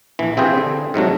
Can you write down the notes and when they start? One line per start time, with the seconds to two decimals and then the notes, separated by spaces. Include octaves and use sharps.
0.19 A#1 E3
0.37 C3 C4 E4 F4 G#4 G5
0.58 D3
0.94 G#2 C3 F#3 A3